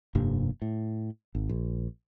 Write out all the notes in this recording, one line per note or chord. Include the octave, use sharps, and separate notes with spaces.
F1 G2 C3 A#3
A2
G#1
A#1